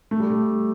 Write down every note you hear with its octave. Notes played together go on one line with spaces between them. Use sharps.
A3
G3
A3